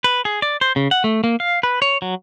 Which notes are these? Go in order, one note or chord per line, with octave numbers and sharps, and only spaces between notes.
B4
G#4
D5
C5
C#3
F#5
A3
A#3
F5
B4
C#5
F#3